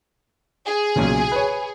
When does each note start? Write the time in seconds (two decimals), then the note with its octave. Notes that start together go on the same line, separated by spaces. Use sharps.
0.66 G#4
0.96 B1 A#2 C#3
1.32 B4 C#5